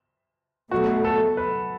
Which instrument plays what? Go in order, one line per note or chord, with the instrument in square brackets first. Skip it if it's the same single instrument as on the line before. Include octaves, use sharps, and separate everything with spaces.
[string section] B2 F#3 A3 [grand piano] F#4
[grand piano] A4
B4